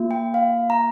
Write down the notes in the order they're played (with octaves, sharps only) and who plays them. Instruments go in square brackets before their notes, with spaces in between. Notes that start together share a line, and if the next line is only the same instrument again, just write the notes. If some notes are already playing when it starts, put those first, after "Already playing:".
Already playing: [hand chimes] A#3 F4
G5
F5
A#5